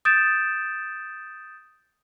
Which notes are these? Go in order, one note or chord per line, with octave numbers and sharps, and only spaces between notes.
D#6 G6 A6 D7 E7